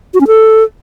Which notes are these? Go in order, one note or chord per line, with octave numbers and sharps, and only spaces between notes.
F#4
C#4
A4